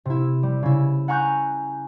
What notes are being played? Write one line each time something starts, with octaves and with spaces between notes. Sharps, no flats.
C3 E4
G3
C#3 E4
F#5 G#5 A#5 C#6 F#6 G6